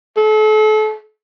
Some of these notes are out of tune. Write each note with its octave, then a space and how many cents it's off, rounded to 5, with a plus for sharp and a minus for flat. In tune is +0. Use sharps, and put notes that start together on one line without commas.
A4 -35